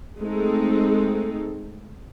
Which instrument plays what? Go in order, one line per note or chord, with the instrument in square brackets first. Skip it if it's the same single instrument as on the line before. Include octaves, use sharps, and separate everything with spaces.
[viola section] G#3 A3 C4 D#4 A4